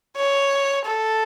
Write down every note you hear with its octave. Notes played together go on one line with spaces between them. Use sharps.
C#5
A4